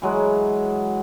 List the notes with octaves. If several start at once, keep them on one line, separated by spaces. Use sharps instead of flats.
E3 F#3 G#3